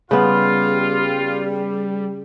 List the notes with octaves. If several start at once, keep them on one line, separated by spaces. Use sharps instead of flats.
C#3 G3 B3 F4 G#4